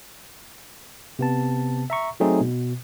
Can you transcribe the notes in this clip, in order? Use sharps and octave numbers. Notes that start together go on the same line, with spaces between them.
C3 B3 A5
E5 A#5 C#6
F#3 A3 C4 D#4 G#4 C5
B2